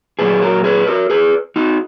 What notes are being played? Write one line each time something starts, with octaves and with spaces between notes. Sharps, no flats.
A#2 F#3 G#4 B4
F#4 A#4
G#4 B4
F#4 A#4
G#4 B4
D#4 F#4